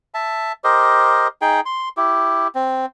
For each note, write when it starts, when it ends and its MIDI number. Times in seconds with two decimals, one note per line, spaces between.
0.14 0.52 76
0.14 0.52 81
0.64 1.28 67
0.64 1.28 70
0.64 1.28 72
0.64 1.28 75
1.41 1.60 63
1.41 1.60 68
1.41 1.60 79
1.66 1.89 84
1.97 2.48 64
1.97 2.48 67
2.55 2.86 60